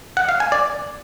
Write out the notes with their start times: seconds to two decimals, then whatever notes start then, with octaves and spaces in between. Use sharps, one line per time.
0.17 F#5
0.29 F5
0.40 G#5
0.52 D5